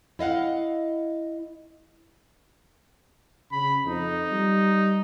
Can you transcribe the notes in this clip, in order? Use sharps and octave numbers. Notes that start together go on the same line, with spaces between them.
E4 D#5 F5 F#5
C#3 B5
F2 D#4
G3